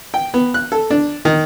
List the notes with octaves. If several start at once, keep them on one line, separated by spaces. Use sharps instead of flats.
G5
B3
F#6
A4
D4
D#3